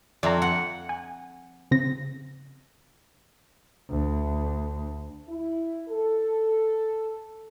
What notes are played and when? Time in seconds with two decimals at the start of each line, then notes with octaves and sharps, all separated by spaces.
0.23 F2 D5 E5 A#5
0.42 F#5
0.89 G#5
1.71 C#3 C4 A#6
3.90 D2
5.29 E4
5.89 A4